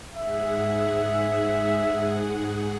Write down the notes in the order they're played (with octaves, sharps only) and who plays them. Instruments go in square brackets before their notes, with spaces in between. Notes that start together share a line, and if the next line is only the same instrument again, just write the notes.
[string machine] G#2 G#4 F#5 [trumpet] E5